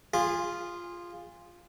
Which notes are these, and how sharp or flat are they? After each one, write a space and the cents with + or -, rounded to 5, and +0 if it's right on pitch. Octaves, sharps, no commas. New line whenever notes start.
F4 +0 G#4 -25